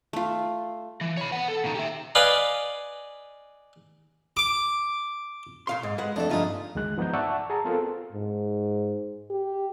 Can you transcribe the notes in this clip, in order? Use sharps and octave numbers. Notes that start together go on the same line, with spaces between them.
A3 F4
E3
C#5 B5
B4 F#5
A4
A#2 D#3
G4 E5
B4 D5 D#5 F5 G#5 B5
D6
A#2 F5 C6
G#2
G#3 B4 F#5
F2 A3 D4 A4
A#1 G2 A3 D#4 F4 G#4
D2 D#3 G#3 F#6
F3 B3 D#4 A#5 G6
D5 E5 F#5 A5 C#6 E6
G#4 A5 A#5
B3 C4 F4 A4 A#4
G#2
G4